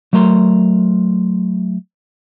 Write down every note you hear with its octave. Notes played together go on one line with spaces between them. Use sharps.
F#3 A3 A#4 A#5 C6